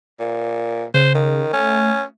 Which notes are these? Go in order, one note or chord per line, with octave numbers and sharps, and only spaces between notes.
A#2
C#3 C5
D#3
A3 C#4